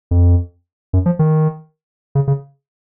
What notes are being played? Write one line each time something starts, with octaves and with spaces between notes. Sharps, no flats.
F2
F#2
F3
D#3
C#3
C#3